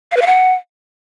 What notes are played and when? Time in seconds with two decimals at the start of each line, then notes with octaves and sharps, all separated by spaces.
0.11 F5
0.16 B4
0.22 F5
0.27 F#5